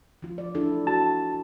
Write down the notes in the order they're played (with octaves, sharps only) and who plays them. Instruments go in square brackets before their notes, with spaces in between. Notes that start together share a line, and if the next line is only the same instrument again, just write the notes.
[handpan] F3 F4
D5
D4 E4 A4
[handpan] F#4 [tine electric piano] A5